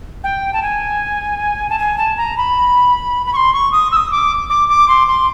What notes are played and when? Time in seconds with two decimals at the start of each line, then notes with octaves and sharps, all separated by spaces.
0.23 G5
0.53 A5
0.62 G#5
1.69 A5
1.78 G#5
1.98 A5
2.17 A#5
2.37 B5
3.25 B5
3.33 C#6
3.36 C6
3.53 C#6
3.72 D#6
3.91 E6
3.96 D#6
4.11 D6
4.49 D6
4.68 D6
4.87 C6
5.07 C6